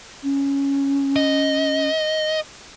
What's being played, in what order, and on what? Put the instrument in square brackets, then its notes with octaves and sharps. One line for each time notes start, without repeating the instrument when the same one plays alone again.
[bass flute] C#4
[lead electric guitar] D#5